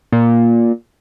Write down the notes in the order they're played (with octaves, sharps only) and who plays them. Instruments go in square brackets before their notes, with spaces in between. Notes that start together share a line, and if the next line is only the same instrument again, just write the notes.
[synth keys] A#2